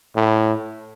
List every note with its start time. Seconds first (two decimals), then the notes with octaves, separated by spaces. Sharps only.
0.16 A2